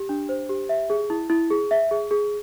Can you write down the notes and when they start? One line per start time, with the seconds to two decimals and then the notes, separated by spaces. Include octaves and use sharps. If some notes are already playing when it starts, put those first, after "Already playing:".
Already playing: G4
0.09 D4
0.29 C5
0.49 G4
0.69 E5
0.90 G#4
1.10 E4
1.30 E4
1.50 G#4
1.71 E5
1.91 G#4
2.11 G#4